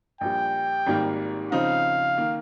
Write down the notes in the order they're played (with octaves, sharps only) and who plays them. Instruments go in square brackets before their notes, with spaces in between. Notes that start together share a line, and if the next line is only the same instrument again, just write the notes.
[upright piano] A#1 A#2 G3 [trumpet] G5
[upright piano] G#1 G#2 D#3 G3 A#3
[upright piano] C#3 F3 C4 D#4 [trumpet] F5
[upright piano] D#3 A#3